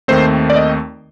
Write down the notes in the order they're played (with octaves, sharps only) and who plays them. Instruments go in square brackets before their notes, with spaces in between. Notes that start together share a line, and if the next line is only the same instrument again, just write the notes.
[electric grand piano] D#2 D#3 A3 C4 C5
D5
D#5